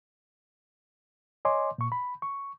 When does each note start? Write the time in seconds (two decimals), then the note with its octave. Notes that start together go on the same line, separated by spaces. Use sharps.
1.45 C#5 D#5 G#5 C6 D6
1.78 A#2 C#6
1.92 B5
2.22 C#6